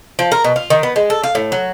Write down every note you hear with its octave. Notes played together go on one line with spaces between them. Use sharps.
F3
A#4
B2
F4
D#3
B3
G#3
A4
F5
A2
F#3